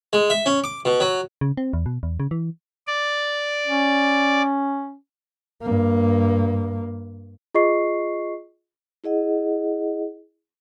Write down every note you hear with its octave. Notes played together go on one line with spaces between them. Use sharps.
G#3
E5
C#4
D6
B2
F#3
C#3
C4
E2
B2
E2
C#3
E3
D5
C#4
G2 A#3
F4 G#4 D#5 C#6 C7
E4 G#4 D#5 F#5